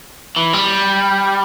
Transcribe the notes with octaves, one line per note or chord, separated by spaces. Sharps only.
E3
G3